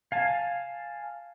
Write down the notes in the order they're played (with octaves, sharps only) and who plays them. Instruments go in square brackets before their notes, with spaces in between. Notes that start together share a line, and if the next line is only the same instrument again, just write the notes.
[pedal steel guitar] F5 G#5 A5